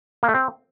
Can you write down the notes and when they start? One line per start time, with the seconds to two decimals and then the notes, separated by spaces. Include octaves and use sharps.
0.23 A#3
0.29 A3
0.35 C4